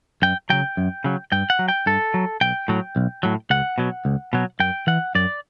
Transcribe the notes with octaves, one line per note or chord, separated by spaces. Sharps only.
F#2 G5
C#3 F#3 G5
F#2
C#3 F#3
G2 G5
F#5
F#3
G5
G2 A4
F#3
B1 G5
A2 F#3
B1
A2 F#3
C#2 F#5
B2 F#3
C#2
B2 F#3
F#2 G5
E3 F#5
F#2 D5